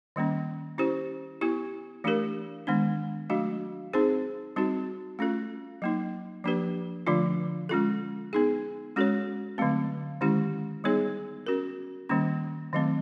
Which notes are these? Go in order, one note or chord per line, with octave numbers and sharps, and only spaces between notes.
D#3 G3 A#3 C#4
C#4 E4 G4 C5
B3 E4 G4
E3 A3 D4 G4 A#4
D#3 G#3 B3 D4
F#3 A3 D4 F#4
C4 D#4 G#4 C5
G3 C4 D#4 F#4
A3 C#4 F4 A4
F#3 A#3 D#4
F3 A#3 D4 G4 B4
D3 F3 A3 D4 F4
G#3 C#4 F4 A4
B3 D#4 G#4
G#3 C#4 F#4 A4 C#5
D3 F#3 A3 C4
D#3 G#3 C#4 E4 G4
G3 B3 D#4 G#4 C#5
C#4 F#4 A#4
D#3 G3 A#3 C#4
D#3 F#3 A3 C4